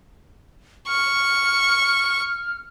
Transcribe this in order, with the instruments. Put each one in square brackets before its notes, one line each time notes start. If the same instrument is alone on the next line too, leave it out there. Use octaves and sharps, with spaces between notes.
[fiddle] C#6 [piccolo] F6